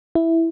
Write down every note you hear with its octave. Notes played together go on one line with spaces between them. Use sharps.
E4